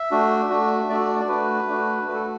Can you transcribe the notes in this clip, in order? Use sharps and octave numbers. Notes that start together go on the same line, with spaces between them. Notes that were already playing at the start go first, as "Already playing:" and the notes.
Already playing: E5
A3 D4 F#4
A3 D4 F#4
A3 D4 F#4 D5
D5
A3 D4 F#4 B4
A3 D4 F#4
A3 F#4 A4 B4